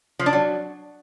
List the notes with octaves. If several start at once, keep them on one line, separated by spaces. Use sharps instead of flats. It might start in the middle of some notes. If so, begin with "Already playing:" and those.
F3
D4
F#3